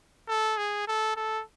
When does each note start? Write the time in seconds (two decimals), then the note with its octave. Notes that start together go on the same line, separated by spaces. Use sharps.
0.28 A4
0.58 G#4
0.88 A4
1.16 A4